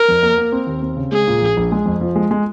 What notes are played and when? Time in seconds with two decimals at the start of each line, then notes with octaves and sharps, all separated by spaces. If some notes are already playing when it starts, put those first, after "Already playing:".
Already playing: A#4
0.08 F2
0.23 A#3
0.38 A#3
0.52 C4
0.67 D#2
0.82 C4
0.97 C#3
1.12 G#3 G#4
1.27 A#2
1.42 A#1
1.57 A#1
1.72 G#3
1.86 F2
2.01 F3
2.16 G#3
2.31 G#3